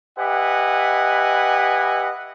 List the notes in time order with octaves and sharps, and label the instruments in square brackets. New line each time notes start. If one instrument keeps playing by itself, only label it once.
[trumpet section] G4 B4 D#5 E5 F#5 G#5